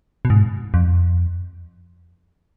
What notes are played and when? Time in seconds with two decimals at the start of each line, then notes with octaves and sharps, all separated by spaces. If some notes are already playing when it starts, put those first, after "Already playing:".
0.25 B2
0.30 G#2
0.74 F2